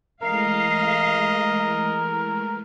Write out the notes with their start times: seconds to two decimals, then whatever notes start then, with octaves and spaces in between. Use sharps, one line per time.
0.22 E3 G#3 A3 A#4 D#5 F5